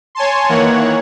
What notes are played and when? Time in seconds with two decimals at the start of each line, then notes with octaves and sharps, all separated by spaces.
0.15 C#5 G#5 A5 C6
0.49 D#3 E3 A#3 C#5 F#5